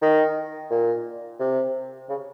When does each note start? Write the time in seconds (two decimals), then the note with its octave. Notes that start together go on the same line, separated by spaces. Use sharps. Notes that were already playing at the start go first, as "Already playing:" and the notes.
0.02 D#3
0.71 A#2
1.40 C3
2.09 C#3